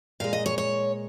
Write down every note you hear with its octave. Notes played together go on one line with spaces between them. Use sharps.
A#2 G#3 F5
D#5
C#5
C#5